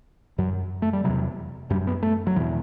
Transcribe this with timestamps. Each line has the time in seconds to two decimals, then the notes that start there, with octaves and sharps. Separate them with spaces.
0.38 F#2 F#3
0.82 A3
0.93 G3
1.04 E2 C3 F#3
1.70 F#2 G3
1.87 B3
2.03 A3
2.27 F#3
2.36 E2 B2 E3